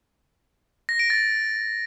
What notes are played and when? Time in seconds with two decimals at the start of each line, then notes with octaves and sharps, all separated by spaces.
0.89 A#6
0.99 D7
1.10 A6